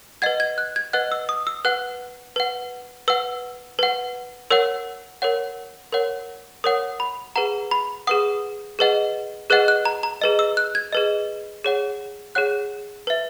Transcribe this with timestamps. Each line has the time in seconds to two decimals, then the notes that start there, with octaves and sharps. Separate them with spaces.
0.22 B4 D#5 F#5 G#6
0.40 G#6
0.58 F#6
0.76 G#6
0.93 B4 D#5 F#5 F#6
1.12 E6
1.29 D#6
1.47 E6
1.65 B4 F#5 F#6
2.36 B4 F#5
3.08 B4 F#5 E6
3.79 B4 F#5
4.51 A#4 C#5 F#5 E6
5.22 A#4 C#5 F#5
5.92 A#4 C#5 F#5
6.64 A#4 C#5 F#5 D#6
7.00 B5
7.36 G#4 B4 F#5 A#5
7.71 B5
8.07 G#4 B4 F#5 D#6
8.79 G#4 B4 D#5 F#5
9.50 G#4 B4 D#5 F#5 F#6
9.68 F#6
9.85 A#5
10.03 A#5
10.21 G#4 B4 D#5
10.39 E6
10.57 F#6
10.75 G#6
10.93 G#4 B4 D#5
11.64 G#4 C#5 F#5
12.35 G#4 C#5 F#5 F#6
13.07 B4 E5